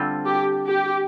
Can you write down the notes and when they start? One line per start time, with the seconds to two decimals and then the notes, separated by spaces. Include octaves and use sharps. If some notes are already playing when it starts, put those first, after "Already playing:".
Already playing: D3 G3 C4 F4 A4
0.26 G4
0.67 G4